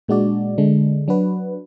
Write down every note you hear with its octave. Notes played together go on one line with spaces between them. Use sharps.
A#2 G#3 D4 F#4 D5
D3 G#3 D4
F#3 D4 F#4 B4